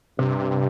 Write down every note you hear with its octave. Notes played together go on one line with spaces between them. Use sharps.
G2 C3